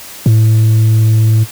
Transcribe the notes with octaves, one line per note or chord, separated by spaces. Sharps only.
A2